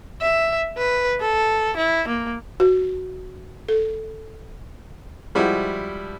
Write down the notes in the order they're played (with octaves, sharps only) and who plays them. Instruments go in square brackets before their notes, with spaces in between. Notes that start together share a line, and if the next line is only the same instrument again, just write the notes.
[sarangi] E5
B4
A4
E4
A#3
[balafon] F#4
A4
[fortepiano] F3 G3 G#3 E4 F#4